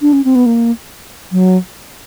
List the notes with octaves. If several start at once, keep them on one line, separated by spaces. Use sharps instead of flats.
D4
C#4
C4
B3
A#3
F#3